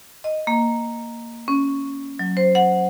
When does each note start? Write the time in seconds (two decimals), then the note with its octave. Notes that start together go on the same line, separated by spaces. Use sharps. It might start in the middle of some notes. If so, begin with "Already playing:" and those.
0.24 D#5
0.47 A#3
1.48 C#4
2.19 F#3
2.37 C5
2.55 F#5